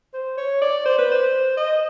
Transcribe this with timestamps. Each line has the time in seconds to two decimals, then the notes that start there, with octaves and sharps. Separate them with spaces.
0.14 C5
0.37 C#5
0.61 D5
0.85 C5
0.98 B4
1.11 C5
1.57 D#5